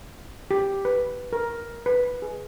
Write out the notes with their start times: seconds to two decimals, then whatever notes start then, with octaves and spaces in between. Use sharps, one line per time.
0.51 G4
0.85 B4
1.33 A#4
1.86 B4
2.22 G#4